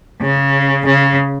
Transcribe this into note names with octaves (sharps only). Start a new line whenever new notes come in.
C#3
C#3